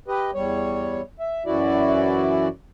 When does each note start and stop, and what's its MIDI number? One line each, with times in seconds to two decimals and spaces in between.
0.08 0.31 67
0.08 0.31 71
0.08 0.31 75
0.34 1.01 40
0.34 1.01 55
0.34 1.01 73
1.20 1.43 76
1.46 2.48 42
1.46 2.48 52
1.46 2.48 64
1.46 2.48 66
1.46 2.48 74